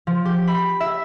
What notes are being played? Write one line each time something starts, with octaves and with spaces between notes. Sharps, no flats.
F3
G4
B5
E5